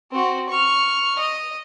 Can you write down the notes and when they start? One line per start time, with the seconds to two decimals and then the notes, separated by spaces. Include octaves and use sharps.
0.12 C4 F#4
0.49 C#6 F6
1.18 D#5